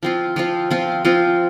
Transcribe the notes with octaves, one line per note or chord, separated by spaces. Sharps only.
F3 C4 F4
F3 C4 F4
F3 C4 F4
F3 C4 F4